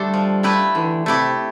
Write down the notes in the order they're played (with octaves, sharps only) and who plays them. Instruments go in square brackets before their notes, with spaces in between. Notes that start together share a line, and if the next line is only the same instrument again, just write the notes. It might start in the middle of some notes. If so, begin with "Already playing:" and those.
Already playing: [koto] D3 A3 D4 A4 C5 [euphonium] G3
[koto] F3
A3 E4 G4 B4
[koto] D3 [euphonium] E3
[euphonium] C3 [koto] A3 E4 G4